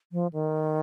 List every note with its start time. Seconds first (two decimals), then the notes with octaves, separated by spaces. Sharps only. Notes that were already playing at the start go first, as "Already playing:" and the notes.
0.12 F3
0.33 D#3